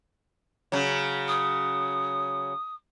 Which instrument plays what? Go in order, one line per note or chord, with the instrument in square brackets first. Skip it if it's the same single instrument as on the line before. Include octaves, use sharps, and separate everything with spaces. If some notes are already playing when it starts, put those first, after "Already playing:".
[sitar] C#3 F#3
[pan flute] D#6